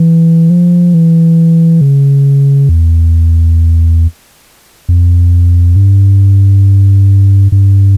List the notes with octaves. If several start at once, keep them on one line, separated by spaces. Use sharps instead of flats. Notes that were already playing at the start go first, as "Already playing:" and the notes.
Already playing: E3
F3
E3
C#3
E2
F2
G2
G2